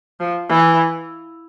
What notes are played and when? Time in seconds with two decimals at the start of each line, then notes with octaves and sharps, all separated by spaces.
0.20 F3
0.50 E3